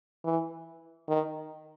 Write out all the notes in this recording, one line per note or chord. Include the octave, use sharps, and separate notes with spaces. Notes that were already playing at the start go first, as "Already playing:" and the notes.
E3
D#3